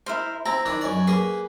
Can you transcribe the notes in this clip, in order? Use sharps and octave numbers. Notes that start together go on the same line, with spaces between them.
E4 A#4 C5
C4 E4 A#5
D#3 D4 E4
F#2 C#4 D5
A#3 G#4 B4